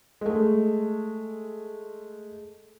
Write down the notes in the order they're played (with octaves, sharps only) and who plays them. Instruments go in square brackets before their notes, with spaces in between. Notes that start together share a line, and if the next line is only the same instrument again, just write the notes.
[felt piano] G#3 A3